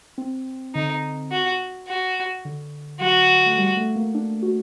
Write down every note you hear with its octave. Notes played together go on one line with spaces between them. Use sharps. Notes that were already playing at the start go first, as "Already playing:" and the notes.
C4
D3 D#4
F#4
F#4
D3
F#3 F#4
A3
G3
A3
A#3
D4
F#4